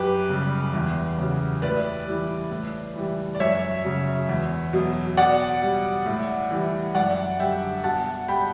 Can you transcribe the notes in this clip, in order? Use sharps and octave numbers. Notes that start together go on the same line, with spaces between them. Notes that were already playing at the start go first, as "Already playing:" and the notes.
Already playing: F#2 G4 B4
C#3 G3
E2
C#3 F#3
A2 B4 D5
E3 G3
A2
E3 G3
D5
F#2 C#5 E5
C#3 F#3
E2
B2 F#3
B2 D5 F#5
G3
A2
E3 G3
F#2 D5 F#5
D3 G3 E5 G5
B2 F#5 A5
G3 G5 B5